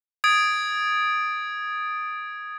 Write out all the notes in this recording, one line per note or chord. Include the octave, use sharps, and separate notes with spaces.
D#6 G#6 A6 D7